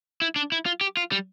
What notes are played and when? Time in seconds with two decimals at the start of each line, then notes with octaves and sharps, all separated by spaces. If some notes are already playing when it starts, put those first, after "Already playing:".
0.22 E4
0.36 D4
0.52 E4
0.66 F4
0.81 G4
0.97 F4
1.12 G3